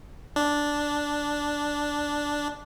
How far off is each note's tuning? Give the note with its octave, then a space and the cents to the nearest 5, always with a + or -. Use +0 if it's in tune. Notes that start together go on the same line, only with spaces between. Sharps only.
D4 -5